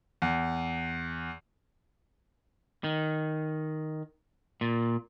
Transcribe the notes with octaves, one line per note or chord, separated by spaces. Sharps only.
E2
D#3
A#2